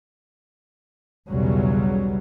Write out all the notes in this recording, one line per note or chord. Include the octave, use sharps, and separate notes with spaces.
B1 E2 C#3 F#3 G3